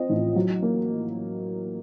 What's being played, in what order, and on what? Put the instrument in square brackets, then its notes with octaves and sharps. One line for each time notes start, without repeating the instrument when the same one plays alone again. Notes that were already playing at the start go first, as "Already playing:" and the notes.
Already playing: [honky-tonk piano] F3 C4 D#5
A1
F#3
A#3